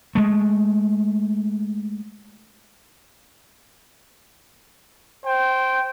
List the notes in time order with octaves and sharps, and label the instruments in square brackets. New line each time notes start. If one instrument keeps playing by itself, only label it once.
[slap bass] G#3 A3
[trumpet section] C5 G5